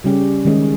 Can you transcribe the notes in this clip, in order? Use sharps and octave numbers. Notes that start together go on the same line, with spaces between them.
C#3 G3 C#4 G4
D#3 G#3 C#4 G#4